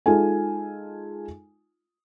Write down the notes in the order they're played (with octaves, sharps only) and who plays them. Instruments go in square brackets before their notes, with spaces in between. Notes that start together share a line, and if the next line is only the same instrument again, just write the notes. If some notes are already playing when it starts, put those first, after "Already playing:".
[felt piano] G#3 D#4 F4 A4 G#5